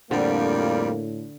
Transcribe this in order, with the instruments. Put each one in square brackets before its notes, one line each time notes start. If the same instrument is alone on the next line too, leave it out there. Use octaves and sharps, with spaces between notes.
[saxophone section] F2 F3 G3 [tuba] A2 [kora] D3 [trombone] A#3